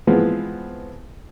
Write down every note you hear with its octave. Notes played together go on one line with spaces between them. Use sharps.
E3 F3 G#3 B3 C4